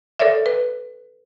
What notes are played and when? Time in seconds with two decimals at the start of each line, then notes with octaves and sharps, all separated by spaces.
0.19 A4 A#4 C#5 D5 E5
0.46 B4